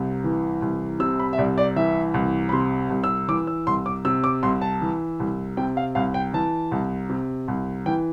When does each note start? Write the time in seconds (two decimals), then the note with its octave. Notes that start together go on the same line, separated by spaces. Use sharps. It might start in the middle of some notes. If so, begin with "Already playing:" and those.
Already playing: C2 C3
0.24 E3
0.62 C2
1.00 C3 E6
1.19 B5
1.33 E5
1.38 C2 D5
1.58 D5
1.76 E3 E5
2.14 C2
2.49 B5
2.52 C3 C6
2.90 C2
3.04 E6
3.28 E3 D6
3.47 E6
3.67 C2 C6
3.86 D6
4.05 C3 E6
4.24 D6
4.43 C2 C6
4.61 A5
4.81 E3
5.20 C2
5.57 C3 G5
5.77 F5
5.95 C2 F5
6.14 G5
6.33 E3 A5
6.72 C2
7.09 C3
7.48 C2
7.86 E3 G5